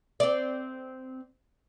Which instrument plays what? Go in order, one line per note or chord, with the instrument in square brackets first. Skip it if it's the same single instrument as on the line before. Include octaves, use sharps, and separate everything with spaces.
[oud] C4 D5